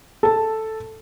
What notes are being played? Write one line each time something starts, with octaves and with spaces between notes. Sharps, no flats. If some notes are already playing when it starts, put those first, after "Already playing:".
A4 A5